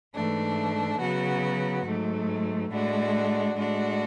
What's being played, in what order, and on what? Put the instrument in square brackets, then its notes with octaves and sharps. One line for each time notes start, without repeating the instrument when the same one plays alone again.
[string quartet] G#2 E3 A3 D4
C#3 F#3 B3 F#4
G#2 F#3 A3
A2 G#3 D4 F#4
A2 G#3 D4 F#4